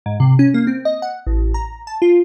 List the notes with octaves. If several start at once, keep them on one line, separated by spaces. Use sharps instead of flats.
G#2
C3
C#4
A#3
C4
D#5
F#5
A1
A#5
A5
F4